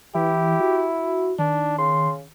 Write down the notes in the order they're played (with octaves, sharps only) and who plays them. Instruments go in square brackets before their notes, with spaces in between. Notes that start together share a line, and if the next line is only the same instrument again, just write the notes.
[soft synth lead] E3 [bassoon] E4 [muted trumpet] G4
[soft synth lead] F#4
[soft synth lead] D#3 [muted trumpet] D4
[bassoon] C#3 [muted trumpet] C6